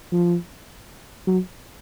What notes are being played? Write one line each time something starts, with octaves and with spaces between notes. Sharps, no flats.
F3
F#3